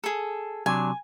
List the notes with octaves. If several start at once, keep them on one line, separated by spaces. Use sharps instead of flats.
G#4 A4
C3 F#3 D4 G#5